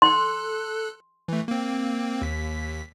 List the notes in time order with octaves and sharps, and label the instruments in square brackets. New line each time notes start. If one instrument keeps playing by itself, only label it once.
[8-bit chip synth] A4 F#6 [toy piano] C6
[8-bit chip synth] E3 A3
A#3 C4
D#2 B6